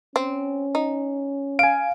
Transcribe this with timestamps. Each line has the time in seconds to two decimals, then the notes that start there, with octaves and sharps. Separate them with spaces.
0.16 C4 C#4
0.75 D#4
1.59 F5 G#5 D7